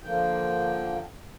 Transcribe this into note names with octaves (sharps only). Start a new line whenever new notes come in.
D3 F3 A#3 G5